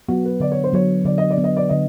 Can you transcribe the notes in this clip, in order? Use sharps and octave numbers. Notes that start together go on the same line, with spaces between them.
F#3 B3 F#4
B4
D3 D5
C#5
C5
F#3 B3 C#5
D3 D5
D#5
D5
F#3 B3
D#5
D5
D3 D#5